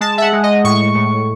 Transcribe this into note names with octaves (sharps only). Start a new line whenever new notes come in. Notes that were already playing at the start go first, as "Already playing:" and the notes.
G#3 A5
E5
F#5
G#3
D#5
A2 C#6
A2